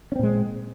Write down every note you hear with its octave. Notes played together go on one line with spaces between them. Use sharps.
A#2 G#3 C4 C#4